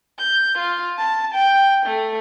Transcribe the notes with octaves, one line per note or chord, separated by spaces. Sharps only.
G6
F4
A5
G5
A3